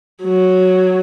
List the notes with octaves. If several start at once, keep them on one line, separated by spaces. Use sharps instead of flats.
F#3